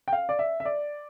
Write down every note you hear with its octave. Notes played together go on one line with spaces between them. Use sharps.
G5
F5
D5
E5
E5
D5